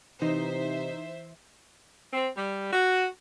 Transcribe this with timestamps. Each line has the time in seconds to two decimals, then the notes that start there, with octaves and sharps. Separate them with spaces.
0.22 C3 E3 D#4 C5 E5
2.12 C4
2.37 G3
2.73 F#4